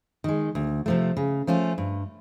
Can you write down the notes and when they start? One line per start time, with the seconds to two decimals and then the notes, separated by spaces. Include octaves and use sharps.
0.24 D#3 G#3
0.55 D2
0.86 C3 F3 A3
1.17 C#3
1.47 F3 A3 C#4 F4
1.78 G2